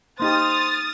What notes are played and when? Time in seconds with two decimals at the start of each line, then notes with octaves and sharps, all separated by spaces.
0.20 A#3 D#4 G4 C5 D#6 F6 A6